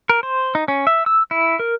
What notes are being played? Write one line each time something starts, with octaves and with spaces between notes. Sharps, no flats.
A#4
C5
D#4
C#4
E5
E6
E4
A#4